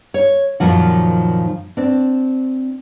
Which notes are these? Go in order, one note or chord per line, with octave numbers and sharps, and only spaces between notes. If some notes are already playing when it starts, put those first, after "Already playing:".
C#5
F#2 A#2 D#3 F3 F#4
C4 D4